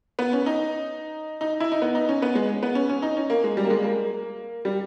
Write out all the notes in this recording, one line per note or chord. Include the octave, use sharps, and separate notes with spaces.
B3
C#4
D#4
D#4
E4
D#4
B3
D#4
C#4
B3
G#3
B3
C#4
C#4
D#4
C#4
A#3
G#3
G3
A#3
G#3
A#3
G3